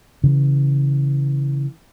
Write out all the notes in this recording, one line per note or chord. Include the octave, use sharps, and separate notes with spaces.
C#3 E3